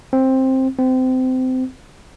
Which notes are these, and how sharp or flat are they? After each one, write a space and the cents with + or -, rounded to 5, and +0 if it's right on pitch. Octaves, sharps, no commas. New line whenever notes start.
C4 +10
C4 -25